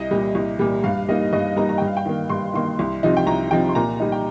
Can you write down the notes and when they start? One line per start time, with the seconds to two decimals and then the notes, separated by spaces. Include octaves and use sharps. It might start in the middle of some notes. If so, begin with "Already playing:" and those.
Already playing: C2 D#5
0.11 A#2 G3
0.35 C2
0.59 A#2 G3
0.84 G2 F5
1.08 G3 A#3 D#4 D#5
1.33 G2 D#5
1.56 G3 A#3 D#4 A#5
1.69 A#5
1.78 G2 G5
1.87 F5
1.97 G5
2.05 D#3 A#3
2.29 G2 C6
2.54 D#3 A#3 C6
2.79 C2
3.03 C3 F3 D#4
3.17 G5
3.27 C2 A#5
3.51 C3 F3 D#4 G5
3.69 C6
3.75 A#2 A#5
4.00 G3 D#4
4.12 G5